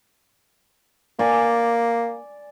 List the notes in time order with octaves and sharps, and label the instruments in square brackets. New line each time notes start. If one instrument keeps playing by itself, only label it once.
[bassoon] A#3 [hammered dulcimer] D5 G#5